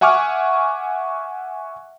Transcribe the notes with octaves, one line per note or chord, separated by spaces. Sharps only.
E5 F#5 G#5 C#6 D6 F6